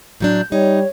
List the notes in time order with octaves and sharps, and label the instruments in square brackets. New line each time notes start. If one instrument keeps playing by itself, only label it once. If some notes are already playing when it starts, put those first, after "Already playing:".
[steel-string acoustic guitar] A2 F#3 D4 [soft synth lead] G6
[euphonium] G3 [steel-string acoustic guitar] D#4 [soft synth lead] C#5